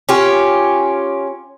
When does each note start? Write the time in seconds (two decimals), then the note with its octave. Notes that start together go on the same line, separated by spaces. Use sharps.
0.09 C#4 F4 G4